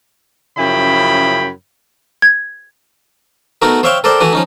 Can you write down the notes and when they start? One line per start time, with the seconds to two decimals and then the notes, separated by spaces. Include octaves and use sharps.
0.57 F#2 C#3 F3 E4 G5 B5
2.22 G#6
3.62 A3 B3 D#4 F#4 A#4
3.83 C5 C#5 E5 F5 G5 C#6
4.04 A4 A#4 C5 D5 G5
4.20 E3 A3 E4 F#4 B4
4.33 F3 C#4 D#4